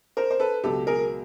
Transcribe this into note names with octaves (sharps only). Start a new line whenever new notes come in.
A#4 C5
C5
A4 B4
C#2 B2 F#3 G4 A4
G#4 A#4